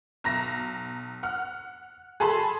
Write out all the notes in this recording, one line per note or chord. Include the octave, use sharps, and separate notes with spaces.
B1 A#5 A#6
F#5 F6
G#4 A4 A5 B5 C6